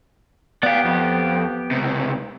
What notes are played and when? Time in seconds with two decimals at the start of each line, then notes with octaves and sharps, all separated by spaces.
0.63 B3 G4 D5 F5
0.85 F2
1.71 C#2 C3